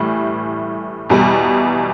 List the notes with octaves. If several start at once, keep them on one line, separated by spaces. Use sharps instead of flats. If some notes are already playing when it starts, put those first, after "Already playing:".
Already playing: A2 E3 G3
E2 B2 G3